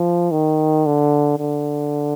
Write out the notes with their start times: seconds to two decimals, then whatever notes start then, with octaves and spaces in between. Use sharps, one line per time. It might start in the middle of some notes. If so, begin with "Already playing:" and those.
Already playing: F3
0.31 D#3
0.86 D3
1.38 D3